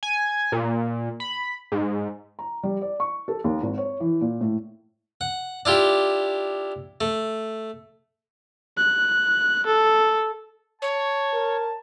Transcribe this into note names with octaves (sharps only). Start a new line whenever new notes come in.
G#5
A#2
B5
G#2
A#5
G3
D5
C#6
A4
D#2
G#1
C#5
E3
A#2
A2
F#5
D4 E4 F4 G4
A3
F#6
A4
C#5 A5
A#4